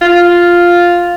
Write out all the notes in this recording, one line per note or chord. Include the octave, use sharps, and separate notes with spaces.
F4